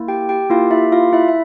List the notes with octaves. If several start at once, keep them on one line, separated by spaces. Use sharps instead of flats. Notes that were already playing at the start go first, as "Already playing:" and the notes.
Already playing: A#3 E4
G4 G5
G4 G5
A#3 E4 F4 G4 F5
E4 E5
F4 F5
E4 E5
E5